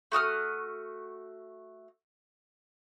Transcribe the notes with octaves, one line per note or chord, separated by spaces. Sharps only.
A3 F#4 D#6 F6